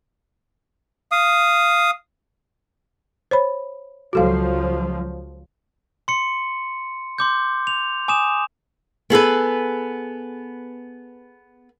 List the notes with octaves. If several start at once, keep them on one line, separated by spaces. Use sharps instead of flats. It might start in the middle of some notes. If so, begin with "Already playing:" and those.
F5 D#6
C5 C#5 B5
C#2 F3 F#3 F#4 A4 F5
C6 C#7
C6 D6 G6
F7
G#5 D6 D#6 E7
B3 G#4 A4 B4